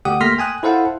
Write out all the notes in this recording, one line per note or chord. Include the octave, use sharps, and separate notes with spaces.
D2 G4 F#5 D#6
A3 A#3 C6 F6 A#6 B6
G5 G#5 D#6 F#6
E4 A4 C5 F5 F#5 A5